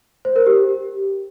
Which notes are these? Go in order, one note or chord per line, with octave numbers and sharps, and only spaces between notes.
C5
A#4
G4